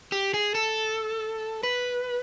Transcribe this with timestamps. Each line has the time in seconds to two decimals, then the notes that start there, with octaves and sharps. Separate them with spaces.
0.12 G4
0.34 G#4
0.55 A4
1.63 B4